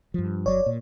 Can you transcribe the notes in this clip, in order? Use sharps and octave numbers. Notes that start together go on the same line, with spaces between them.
G2 F3
G1 F#3 C#5 D5
A#2